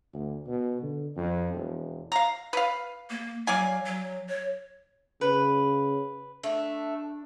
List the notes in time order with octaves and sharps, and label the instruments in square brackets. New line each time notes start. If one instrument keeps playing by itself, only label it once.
[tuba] D2
B2
D3
F2
E1
[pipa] F5 A#5
B4 F5
[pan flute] A#3
[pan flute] F#3 [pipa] D5 F5 G#5
[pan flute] F#3
C#5
[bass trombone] C#3 [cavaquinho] B4
[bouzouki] A3 [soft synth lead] D4